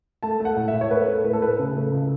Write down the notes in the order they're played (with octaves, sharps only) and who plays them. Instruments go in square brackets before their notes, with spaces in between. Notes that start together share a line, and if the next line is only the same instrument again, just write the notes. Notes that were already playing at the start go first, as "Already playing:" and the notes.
[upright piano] A3 A5
A3
F#5
A2
E5
A2
C#5
A3 B4
A3
A2 B4
A4
A2 B4
C#3
A3
C#2